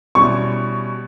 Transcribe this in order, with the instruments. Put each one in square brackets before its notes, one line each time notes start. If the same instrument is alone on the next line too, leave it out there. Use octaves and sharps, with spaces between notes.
[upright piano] B2 G3 C#4 E4 [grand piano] C#6